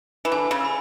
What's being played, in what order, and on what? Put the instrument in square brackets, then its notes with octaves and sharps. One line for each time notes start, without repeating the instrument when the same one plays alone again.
[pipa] E3
[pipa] D3 [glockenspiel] G#5
[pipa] C#3
[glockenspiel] B5 E6